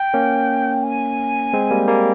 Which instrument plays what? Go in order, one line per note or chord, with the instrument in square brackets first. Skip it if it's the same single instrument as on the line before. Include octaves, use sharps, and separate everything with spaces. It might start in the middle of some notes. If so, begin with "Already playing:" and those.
Already playing: [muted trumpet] G5
[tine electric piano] A#3 C#4
[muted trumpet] G#5
[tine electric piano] G#3 C4
G3 A#3
G3 A#3